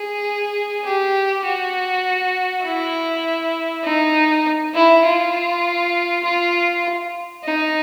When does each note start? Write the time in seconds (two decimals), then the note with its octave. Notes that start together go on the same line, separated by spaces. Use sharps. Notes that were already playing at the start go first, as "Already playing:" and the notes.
Already playing: G#4
0.84 G4
1.45 F#4
2.65 E4
3.85 D#4
4.75 E4
5.05 F4
6.24 F4
7.45 D#4